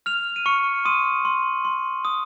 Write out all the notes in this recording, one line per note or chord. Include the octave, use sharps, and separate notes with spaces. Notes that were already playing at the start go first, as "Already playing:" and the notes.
F6 F7
D#7
C#6 F6 C#7
C6 D#6 D#7
C6
C6
D#6